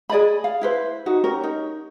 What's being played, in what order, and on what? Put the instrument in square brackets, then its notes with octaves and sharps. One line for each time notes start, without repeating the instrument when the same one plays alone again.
[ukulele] G#4 D5 D#5 B5
F5
E4 B4 C5
D#4 F#4
C#4 G4 A#4
D#4